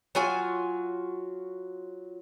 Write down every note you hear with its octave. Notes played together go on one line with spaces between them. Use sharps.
F#3 F4 F#4 G#5